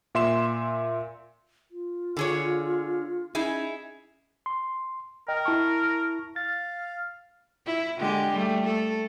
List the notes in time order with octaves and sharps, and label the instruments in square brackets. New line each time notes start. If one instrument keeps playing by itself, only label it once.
[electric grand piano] A#2 E5 C6 E7
[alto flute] F4
[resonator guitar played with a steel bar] D3 G#4 C#5
[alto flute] C#4 [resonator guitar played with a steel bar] D#4 E4 G#4
[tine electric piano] C6
[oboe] A#4 [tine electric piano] D#5 G5
[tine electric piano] E4 A5 C#6
[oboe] F5 [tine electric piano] A6
[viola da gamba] E4
D3 G#3 G4
G3 A3
A3 A4